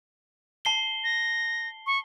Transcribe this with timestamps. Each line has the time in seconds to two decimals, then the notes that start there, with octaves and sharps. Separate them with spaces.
0.65 A5 C7 G7
1.04 A#6
1.86 C#6